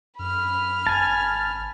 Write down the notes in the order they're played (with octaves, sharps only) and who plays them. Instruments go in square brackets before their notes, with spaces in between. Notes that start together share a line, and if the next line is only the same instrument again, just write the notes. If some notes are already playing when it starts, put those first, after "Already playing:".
[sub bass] F#2 [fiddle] B5 F6
[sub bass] G#1 [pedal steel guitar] G#5 A5